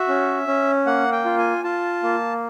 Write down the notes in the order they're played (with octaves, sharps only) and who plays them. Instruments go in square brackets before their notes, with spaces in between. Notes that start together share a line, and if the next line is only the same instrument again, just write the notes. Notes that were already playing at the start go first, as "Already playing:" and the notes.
Already playing: [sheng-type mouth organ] F#4 E5
C#4
C#4
A#3 F#5
G5
F4
G#5
F4 A5
A#3